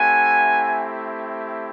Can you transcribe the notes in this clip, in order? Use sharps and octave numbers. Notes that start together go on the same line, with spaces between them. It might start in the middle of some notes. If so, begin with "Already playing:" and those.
Already playing: A3 C4 E4 G4 F#5 G#5